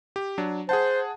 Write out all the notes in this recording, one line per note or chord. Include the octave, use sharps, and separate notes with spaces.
G4
F#3 D4
G#4 C5 F#5 A5